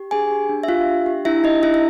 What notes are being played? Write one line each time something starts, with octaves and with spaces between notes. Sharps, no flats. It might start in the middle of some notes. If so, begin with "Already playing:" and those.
Already playing: G4
D4 G#4 G#5
G4
D4
E5
F4 G4 F5
D4
G4
D4 E4 E5
D#4 G4 D#5
D4 E4 E5
E5